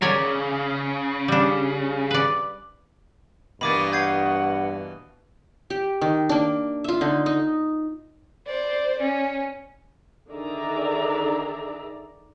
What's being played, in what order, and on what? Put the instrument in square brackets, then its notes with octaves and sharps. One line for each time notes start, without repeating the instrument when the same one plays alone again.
[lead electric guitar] C#3 [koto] A#4 C#5 D5
[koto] G3 D4
B4 D5
[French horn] G2 [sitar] B2 E3 A#3 [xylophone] B5 D6 A6
[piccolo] F#5 [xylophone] G6 G#6 C7
[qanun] G4
D#3
A#3 D4
F4 E5
D3 D#4
D#4
[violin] C5 D5
C#4
[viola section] D3 D#3 G#4 D5 E5 A#5